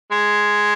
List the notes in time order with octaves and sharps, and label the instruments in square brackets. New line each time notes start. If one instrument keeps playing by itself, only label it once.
[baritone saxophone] G#3